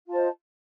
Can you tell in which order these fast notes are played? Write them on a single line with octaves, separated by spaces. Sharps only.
F4 A5 C5 D#5